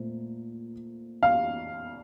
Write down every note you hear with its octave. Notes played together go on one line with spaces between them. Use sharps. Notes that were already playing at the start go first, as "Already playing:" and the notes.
Already playing: A#2 A3 C4
F5